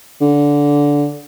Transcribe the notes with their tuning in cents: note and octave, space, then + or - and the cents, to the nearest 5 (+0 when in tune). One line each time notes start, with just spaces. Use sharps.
D3 -15